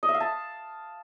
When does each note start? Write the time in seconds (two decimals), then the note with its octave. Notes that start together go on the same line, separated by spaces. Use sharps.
0.03 D#5
0.09 E5
0.15 F5
0.20 A5